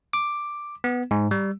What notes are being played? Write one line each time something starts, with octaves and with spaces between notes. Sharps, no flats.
D6
B3
G#2
G3